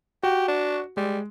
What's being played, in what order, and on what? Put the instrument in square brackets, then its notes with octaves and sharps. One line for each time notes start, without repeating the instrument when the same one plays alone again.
[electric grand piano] F#4 [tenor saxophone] G4
[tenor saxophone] D4
[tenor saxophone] G3 [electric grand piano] G#3